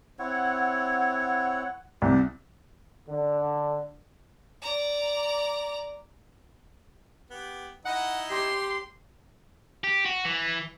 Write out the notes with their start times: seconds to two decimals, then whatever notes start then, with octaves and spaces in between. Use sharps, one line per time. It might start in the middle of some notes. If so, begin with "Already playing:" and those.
0.19 C4 E4 C#5 F#5
2.02 C2 G4 F#5
3.09 D3
4.62 D5 A#5
7.30 B3 G4
7.85 D#4 E4 D#5 F#5
8.31 G4 C6
9.84 G4
10.05 F#4
10.25 E3